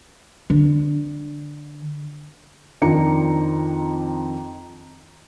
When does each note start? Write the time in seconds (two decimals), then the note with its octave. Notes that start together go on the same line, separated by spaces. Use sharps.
0.50 D3
2.82 F2 D#3 D4 A#5 C#7